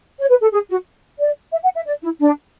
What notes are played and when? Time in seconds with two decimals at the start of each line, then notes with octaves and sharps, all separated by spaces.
0.19 C#5
0.30 B4
0.41 A4
0.52 G#4
0.69 F#4
1.19 D5
1.52 E5
1.63 F#5
1.75 E5
1.86 D5
2.02 E4
2.20 D4